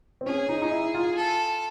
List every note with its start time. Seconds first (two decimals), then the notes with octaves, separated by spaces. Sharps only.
0.21 C4
0.26 C#4 G#4
0.49 D#4
0.62 D#4
0.72 E4
0.94 F4
1.17 A4